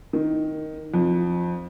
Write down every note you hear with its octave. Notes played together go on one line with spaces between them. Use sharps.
D#3
F2